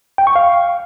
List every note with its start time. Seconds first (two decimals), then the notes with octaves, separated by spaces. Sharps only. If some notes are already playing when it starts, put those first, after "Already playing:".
0.18 G5
0.27 C#6
0.36 F5